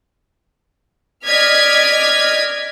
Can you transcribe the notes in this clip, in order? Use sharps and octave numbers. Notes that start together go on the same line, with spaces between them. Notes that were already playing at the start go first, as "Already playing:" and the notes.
D5 D#5 F6 G#6 B6